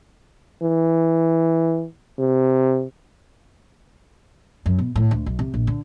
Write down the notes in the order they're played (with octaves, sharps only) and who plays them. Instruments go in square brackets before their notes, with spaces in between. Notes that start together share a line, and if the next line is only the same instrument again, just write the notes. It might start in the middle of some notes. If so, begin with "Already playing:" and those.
[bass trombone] E3
C3
[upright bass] F#2
B2
A2
D2
B1
C3
A#1
D3